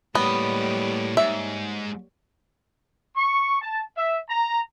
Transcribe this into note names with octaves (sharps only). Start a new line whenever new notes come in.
A2 G3 A#3 B3 C#5 D#5
G#2 E5
C#6
A5
E5
A#5